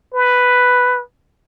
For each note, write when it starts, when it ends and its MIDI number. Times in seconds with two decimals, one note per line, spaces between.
0.14 1.02 71